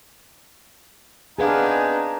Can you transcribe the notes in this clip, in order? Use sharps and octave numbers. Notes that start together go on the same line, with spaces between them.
B3 C4 D4 D#4 G#4 B4 F5 G#5